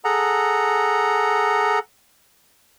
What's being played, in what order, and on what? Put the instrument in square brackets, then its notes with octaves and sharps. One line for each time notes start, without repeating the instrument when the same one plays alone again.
[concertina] G#4 A4 F#5 A#5